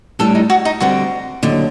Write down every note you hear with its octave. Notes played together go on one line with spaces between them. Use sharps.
A2 G3 D4 A4
D#4
F#4
D#4
D3 G3 C4 F#4
D#2 D3 F#3